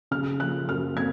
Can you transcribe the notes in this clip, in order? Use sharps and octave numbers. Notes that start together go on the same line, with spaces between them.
C#3 F6
F3 F#6
F#2 F6
C4 G#6